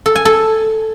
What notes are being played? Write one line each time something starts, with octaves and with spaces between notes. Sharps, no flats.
A4
G#5
A4